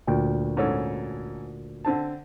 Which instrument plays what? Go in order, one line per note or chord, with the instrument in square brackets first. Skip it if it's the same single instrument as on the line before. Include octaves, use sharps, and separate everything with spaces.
[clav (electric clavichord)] D2 A#2 G5
[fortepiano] G#2 C#4 A4
D3 C4 A5